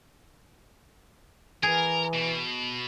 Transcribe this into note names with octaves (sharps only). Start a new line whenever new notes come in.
E3 G#4 A#4
B2